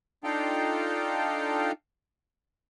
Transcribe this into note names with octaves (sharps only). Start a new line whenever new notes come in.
D4 D#4 F4 A4 F5 G5